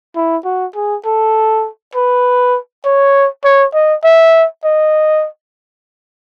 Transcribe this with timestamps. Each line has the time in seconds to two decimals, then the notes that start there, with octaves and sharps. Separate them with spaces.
0.16 E4
0.45 F#4
0.75 G#4
1.05 A4
1.95 B4
2.85 C#5
3.44 C#5
3.74 D#5
4.04 E5
4.64 D#5